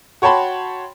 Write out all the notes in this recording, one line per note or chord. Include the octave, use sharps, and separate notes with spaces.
F#4 C#5 G5 A5 B5 C6